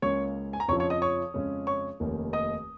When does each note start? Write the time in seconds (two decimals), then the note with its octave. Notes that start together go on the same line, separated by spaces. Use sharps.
0.02 C#2 C#3 A#3 C#4 C#5 C#6
0.53 G#5
0.60 A#5
0.68 F2 C#3 F3 C#5 C#6
0.80 C#5 C#6
0.90 D#5 D#6
1.02 C#5 C#6
1.34 F2 C#3 G#3 C#4
1.67 C#5 C#6
2.00 F1 D#2 D#3 A#3 C#4
2.33 D#5 D#6